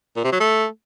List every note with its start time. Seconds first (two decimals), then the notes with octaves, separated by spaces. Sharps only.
0.17 A#2
0.25 C3
0.32 F#3
0.40 A3